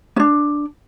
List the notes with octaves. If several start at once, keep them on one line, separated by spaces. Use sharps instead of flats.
C#4 D4